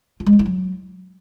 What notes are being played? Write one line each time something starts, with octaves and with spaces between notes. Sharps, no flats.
F4
G#3
F4
E4
F#3